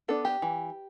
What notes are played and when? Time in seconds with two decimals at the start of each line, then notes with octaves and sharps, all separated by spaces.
0.08 B3 D4 A4
0.25 G4
0.42 E3